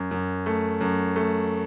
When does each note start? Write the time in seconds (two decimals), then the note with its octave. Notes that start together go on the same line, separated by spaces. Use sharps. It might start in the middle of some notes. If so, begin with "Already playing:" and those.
Already playing: F#2
0.11 F#2
0.46 A3
0.81 F#2
1.16 A3